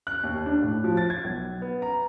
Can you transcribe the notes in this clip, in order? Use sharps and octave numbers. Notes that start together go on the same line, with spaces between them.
F#6
D#2
D4
A2
F3
A6
G#6
B1
B3
A#5